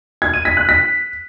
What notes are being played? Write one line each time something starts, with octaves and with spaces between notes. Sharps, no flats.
G#6
D#7
B6
F#6
B6